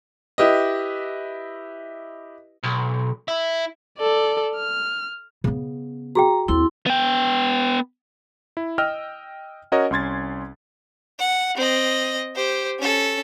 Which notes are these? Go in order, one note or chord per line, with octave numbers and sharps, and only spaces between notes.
E4 G4 B4 D#5
B1
E4
A4 D5
F6
C#3 B3
F#4 G#4 G5 A#5
D#2 C4 E4 C6
B3 G5
E4
D#5 G5 E6 F6
C#4 F#4 A#4 C#5 D#5
C2 C#4 C6 G#6 A6
F#5
C4 D#5
G4 C5
C#4 A4